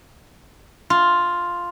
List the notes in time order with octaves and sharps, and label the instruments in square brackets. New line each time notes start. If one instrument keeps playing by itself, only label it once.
[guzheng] F4